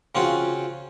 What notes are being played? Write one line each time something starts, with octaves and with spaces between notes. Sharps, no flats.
C#3 C4 C#4 F4 F#4